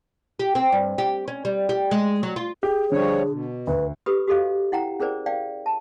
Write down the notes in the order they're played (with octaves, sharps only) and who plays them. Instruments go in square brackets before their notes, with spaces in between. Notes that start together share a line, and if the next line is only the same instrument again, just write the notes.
[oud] G4
C4
G2
G4
C#4
G3
G4
G#3
F#3
F4
[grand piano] G4 [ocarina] G#4
[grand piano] D3 [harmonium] F3 G3 C#5
[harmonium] B2
[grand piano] D2 [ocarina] B4
[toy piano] G4 A4 B4 B5 D#6
F#4 G4 A4 D#5 F5
E4 F#5 G5 A#5
C#4 G#4 A#4 C5 D5
D5 F5 G5
A5